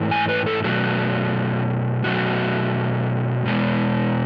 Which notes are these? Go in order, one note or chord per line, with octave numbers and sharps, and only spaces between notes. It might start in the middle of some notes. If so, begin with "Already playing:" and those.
Already playing: G#2 E3 A3
G#5
B4
A4
B2 F#3 A3 F#4
B2 F#3 A3 F#4
B2 G#3 B3